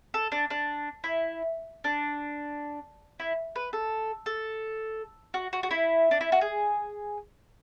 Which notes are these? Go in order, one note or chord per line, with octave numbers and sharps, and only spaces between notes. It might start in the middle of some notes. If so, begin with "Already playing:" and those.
A4
D4
D4
E4
D4
E4
B4
A4
A4
F#4
F#4
F#4
E4
D4
E4
F#4
G#4